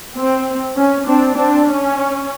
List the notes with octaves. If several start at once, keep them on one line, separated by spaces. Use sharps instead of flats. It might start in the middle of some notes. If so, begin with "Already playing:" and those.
C4
C#4
C4 D4
C4 D4
C#4